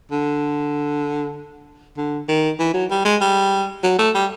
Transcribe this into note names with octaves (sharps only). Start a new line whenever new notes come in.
D3
D3
D#3
E3
F#3
G3
G#3
G3
F#3
A3
G3